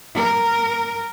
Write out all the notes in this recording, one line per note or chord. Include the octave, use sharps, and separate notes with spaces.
A#4